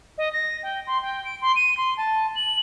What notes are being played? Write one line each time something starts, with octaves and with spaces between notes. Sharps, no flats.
D#5
A#6
G5
C6
G5
D7
C6
D#7
C6
A5
F#7